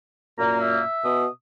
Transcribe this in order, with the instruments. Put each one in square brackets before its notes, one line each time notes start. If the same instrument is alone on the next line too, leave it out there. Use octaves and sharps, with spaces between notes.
[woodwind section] F#2 A#2 A#3 [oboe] A#5
[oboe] E5
[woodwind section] B2 D#6